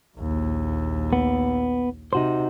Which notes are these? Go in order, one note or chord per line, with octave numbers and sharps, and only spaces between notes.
A#1 D#2
B3
C3 D#4 F#4 C5